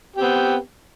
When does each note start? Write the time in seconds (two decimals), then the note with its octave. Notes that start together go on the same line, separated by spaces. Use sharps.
0.16 G4
0.19 C4
0.21 B3